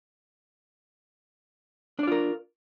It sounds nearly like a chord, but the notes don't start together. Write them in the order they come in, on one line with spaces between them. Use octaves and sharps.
D4 D5 F4 A#4